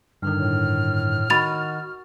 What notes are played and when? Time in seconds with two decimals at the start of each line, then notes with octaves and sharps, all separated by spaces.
0.22 G2 D3 D#3 F6
0.37 A2
1.30 D#3 F#4 D#5 B5 A6 F7